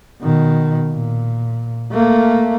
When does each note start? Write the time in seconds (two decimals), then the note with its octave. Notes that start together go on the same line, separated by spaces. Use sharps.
0.22 B2 D#3
0.90 A#2
1.92 A3 A#3